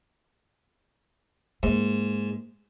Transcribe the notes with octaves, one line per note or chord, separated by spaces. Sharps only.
G#2 A#3